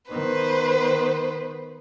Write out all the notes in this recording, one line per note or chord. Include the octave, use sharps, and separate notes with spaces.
D#3 B3 B4 C5